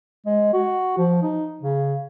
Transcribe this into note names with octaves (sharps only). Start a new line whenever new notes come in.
G#3
F#4
F3
D#4
C#3